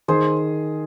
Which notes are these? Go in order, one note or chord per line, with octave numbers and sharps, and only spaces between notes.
D#3 G#4 C5